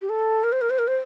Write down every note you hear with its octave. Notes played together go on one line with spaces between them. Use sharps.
G4
A4
A#4
C5
A#4
C5
A#4
C5